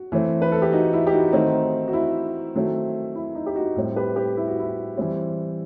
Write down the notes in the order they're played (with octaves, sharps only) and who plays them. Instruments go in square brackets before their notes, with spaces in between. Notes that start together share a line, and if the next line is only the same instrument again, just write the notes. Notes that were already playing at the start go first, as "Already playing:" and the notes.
Already playing: [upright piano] F#4
E3 A3 C4
B4
A4
G4
D#4 F#4
E4
G4
D#4 F#4
D#3 A3 C4 D#4 F#4
F#4
E4
D#3 F#3 A3 C4
E4
D#4
G4
D#4 F#4
A2 G3 C4
G4 B4
G4 B4
E4
F#4
E4
E3 G3 C4